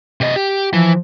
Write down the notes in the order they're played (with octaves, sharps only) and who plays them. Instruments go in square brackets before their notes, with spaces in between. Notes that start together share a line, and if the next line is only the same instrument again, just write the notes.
[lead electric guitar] C3 D#5
G4
[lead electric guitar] E3 [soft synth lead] F3